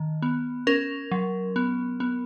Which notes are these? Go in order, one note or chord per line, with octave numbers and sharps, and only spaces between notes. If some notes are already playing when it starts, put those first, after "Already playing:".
Already playing: D#3
B3
C#4 A#4
F#3
B3
B3